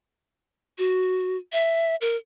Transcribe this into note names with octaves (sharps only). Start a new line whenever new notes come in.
F#4
E5
A#4